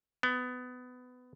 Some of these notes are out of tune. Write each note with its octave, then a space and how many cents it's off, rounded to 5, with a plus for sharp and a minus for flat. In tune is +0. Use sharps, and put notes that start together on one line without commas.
B3 +20